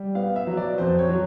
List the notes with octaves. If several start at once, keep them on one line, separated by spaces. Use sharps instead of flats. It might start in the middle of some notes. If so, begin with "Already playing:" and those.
Already playing: G3
B3 F5
E5
F#3
D5
F2 C5
C#5
F#3